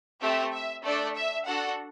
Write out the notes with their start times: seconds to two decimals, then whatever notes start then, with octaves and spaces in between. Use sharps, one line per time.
0.20 A3 C4 G4 E5
0.52 E5
0.84 A3 D4 A4 D5
1.15 E5
1.47 D4 F#4 A4 F#5